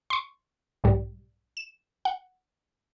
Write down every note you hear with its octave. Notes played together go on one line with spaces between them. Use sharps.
C6 C#6
B1 G#2 G3
E7
F#5